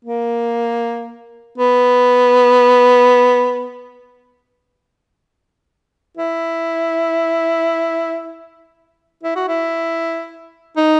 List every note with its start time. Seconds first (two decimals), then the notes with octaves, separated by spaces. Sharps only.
0.05 A#3
1.58 B3
6.17 E4
9.23 E4
9.36 F#4
9.48 E4
10.77 D#4